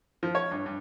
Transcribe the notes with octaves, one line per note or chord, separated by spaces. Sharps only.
F3
C#5
G2
G2